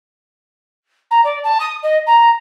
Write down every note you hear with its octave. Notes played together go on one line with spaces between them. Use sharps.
A#5
D5
A5
D#6
D#5
A#5